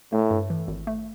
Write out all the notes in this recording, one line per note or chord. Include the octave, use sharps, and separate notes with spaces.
A2 A3
G2
E3
G#1
A3